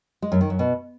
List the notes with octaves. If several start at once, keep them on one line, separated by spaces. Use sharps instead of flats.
G#3
F#2
D#3
F#2
B2